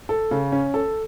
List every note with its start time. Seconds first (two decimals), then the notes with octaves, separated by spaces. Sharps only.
0.09 A4
0.31 C#3
0.52 C#4
0.74 A4